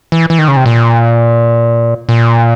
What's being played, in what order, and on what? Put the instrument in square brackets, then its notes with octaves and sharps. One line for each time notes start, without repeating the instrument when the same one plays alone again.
[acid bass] E3
E3
D#3
C#3
C3
A#2
A#2